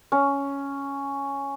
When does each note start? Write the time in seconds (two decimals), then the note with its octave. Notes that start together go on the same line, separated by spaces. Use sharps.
0.12 C#4